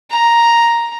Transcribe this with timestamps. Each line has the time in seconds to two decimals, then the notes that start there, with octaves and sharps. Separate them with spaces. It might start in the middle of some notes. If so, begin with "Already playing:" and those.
0.10 A#5